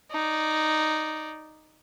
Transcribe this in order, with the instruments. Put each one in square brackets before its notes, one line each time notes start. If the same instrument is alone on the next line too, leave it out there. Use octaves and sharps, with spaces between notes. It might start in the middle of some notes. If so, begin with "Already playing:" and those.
[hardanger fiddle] D#4 D5